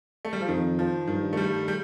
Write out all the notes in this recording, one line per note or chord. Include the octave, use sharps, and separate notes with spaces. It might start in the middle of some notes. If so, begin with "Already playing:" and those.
A3
G3
F3
F2 D#3
F3
G2 D#3
A3
G3
G3